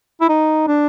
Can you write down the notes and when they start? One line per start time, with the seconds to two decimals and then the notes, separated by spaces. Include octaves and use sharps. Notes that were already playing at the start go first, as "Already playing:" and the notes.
0.21 E4
0.29 D#4
0.67 D4